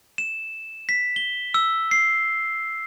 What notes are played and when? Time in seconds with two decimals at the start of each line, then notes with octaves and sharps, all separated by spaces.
0.18 E7
0.89 B6
1.16 G7
1.54 E6
1.91 C7